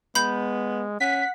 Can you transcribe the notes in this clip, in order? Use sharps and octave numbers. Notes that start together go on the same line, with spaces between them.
G#3 B3 B5 G6
C#4 F#5 B6